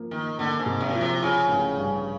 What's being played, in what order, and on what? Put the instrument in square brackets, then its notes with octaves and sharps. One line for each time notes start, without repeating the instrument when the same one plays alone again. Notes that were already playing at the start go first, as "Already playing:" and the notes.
Already playing: [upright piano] F3 A#3
[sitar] D#3 [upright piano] A#3
[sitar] D3 [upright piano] A#3
[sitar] G#2
[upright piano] C3
[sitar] F#2
[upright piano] F3
[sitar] C3
[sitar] C#3 [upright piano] F3
[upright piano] A1
G2